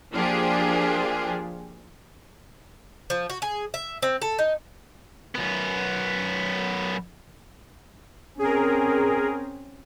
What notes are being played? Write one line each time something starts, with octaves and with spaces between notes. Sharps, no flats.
F3 A#3 D4 F4 G4 G#4
F3
F#4
G#4
E5
C4
A4
D#4
F#2 B3
C4 C#4 G#4 A#4